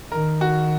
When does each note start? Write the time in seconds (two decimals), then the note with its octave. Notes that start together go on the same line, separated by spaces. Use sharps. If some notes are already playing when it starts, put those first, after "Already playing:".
0.11 D#3 A#4
0.41 F#4